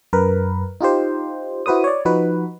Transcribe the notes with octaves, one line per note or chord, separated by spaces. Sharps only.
F#2 A#4 B4
D#4 F4 G4 C5
E4 F#4 B4 C5 D#6
C#5 D5
F3 D#4 F#4 B4